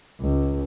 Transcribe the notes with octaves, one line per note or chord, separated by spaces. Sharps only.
C#2